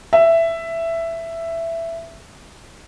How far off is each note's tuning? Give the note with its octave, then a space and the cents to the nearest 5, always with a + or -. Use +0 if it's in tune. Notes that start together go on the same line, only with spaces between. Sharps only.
E5 +10